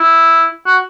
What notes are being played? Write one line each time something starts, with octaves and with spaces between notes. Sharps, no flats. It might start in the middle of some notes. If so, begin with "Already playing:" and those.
Already playing: E4
F#4